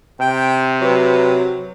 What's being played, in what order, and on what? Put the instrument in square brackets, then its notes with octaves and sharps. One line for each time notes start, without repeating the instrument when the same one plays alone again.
[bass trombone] C3 [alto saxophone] G5
[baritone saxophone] F#3 [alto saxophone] B4